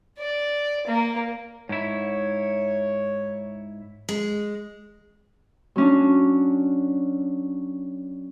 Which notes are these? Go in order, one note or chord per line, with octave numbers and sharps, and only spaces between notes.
D5
A#3
G#2 E4 C#5
G#3
F#3 C#4 D4